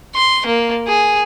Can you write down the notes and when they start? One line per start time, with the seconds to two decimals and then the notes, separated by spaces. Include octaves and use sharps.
0.15 C6
0.46 A#3
0.87 G#4